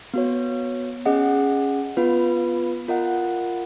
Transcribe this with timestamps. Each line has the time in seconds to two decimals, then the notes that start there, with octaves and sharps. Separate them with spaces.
0.14 B3 F#4 C#5
1.06 C#4 G#4 D#5 F#5
1.97 B3 F4 B4
2.88 F4 A#4 D#5 F#5